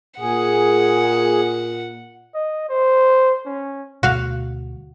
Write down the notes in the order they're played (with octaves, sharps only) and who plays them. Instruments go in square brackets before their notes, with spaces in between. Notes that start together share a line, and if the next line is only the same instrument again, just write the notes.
[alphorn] A#2 [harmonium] G#4 [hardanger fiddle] F#5
[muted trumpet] D#5
C5
C#4
[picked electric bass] D2 B2 G3 [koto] F#4 F5